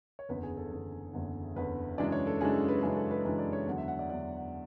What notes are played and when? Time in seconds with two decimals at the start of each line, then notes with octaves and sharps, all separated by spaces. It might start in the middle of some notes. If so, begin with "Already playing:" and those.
0.19 C#5
0.29 F#1 E2 D3 B4
0.43 G#4
0.57 A4
0.71 F#1 E2 D3
1.13 F#1 E2 D3
1.56 F#1 E2 D3 B4
1.98 F#2 C#3 E3 G#3 D4 D5
2.12 C#5
2.27 A4
2.41 F#2 C#3 E3 G#3 D4 G#4
2.54 A4
2.68 B4
2.82 F#2 C#3 E3 G#3 D4 G#4
2.97 A4
3.11 B4
3.25 F#2 C#3 E3 G#3 D4 B4
3.39 D5
3.53 C#5
3.67 E2 D3 F#3 F#5
3.78 E5
3.88 F#5
3.99 D5
4.10 E2 D3 F#3 D5
4.37 F#5